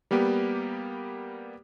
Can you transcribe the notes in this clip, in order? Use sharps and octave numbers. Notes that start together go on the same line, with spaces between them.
G3 A#3 B3 G4